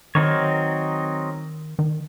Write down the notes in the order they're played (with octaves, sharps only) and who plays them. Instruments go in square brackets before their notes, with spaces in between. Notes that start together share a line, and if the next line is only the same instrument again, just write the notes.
[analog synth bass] D#3 [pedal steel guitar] F#3 C4 D#4 A#4 C#5
[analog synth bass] D#3